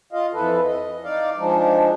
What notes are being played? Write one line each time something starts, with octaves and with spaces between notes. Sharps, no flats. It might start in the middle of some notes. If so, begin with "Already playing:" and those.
F4 D#5 F5
F2 E3 A4 B4
D#5
D#4 D5 F5
F3 G#3 D4 D#4